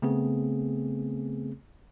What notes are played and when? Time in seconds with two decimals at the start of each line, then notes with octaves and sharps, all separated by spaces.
0.02 C#3 A3 B3 C4 G#4